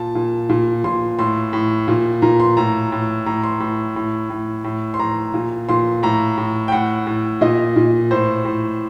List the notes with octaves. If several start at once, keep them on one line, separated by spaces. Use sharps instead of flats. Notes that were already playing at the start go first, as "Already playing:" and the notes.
Already playing: A#2 A5
A#2
A#2
A#2 C6
A2 C6
A2
A#2
A#2 A#5
C6
A2 A#5
A2
A2 A#5
C6
A2
A2
A2
A2
C6
A2 A#5
A#2
A#2 C6
A2 A#5
A2
G5
A2 F#5
A2
A#2 D#5
A#2
A2 C5
A2